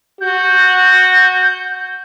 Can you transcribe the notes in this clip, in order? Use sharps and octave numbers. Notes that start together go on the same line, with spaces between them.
F#4 G6